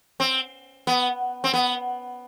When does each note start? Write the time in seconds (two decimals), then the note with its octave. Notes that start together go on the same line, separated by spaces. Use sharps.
0.20 C4
0.87 B3
1.44 C4
1.54 B3